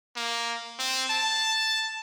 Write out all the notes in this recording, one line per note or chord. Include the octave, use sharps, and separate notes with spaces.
A#3
C4
A5